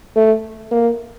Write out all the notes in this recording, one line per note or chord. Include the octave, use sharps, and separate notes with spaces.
A3
A#3